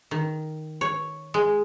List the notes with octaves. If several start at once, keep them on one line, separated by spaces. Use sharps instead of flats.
D#3
C#5
G#3